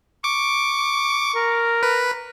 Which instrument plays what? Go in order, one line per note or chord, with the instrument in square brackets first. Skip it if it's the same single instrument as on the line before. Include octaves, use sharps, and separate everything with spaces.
[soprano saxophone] C#6 [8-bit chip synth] D6
[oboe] A#4
[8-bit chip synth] B4